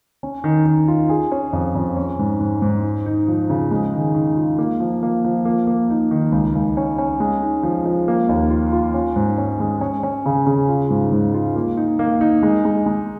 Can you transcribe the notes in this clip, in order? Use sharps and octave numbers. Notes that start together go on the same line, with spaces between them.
C#4
D#3
D#3
F4
G#4
C#4
F2
F2
C#4
G#2
G#2
G#2
D#4
D#4
F3
C#3
G#3
D#3
D#3
F4
A#3
F3
A#3
F3
A#3
A#3
D#4
D#3
C#2
C#2
C#4
C#4
G#3
D#4
F3
F3
A#3
D#2
F4
F4
C#4
G#2
C#4
G#3
C#4
C#4
C#3
C#3
F4
G#2
G#2
F4
A#3
D#4
A#3
D#4
G#3
G#3
G#3